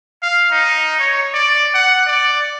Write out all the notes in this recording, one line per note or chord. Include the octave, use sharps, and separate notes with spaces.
F5
D#4
C#5
D5
F#5
D5